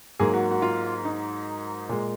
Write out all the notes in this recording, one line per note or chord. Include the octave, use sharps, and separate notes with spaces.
G#2 F#3 A#3 G#4
F#4
F#4
F4
D#4
A#2 G#3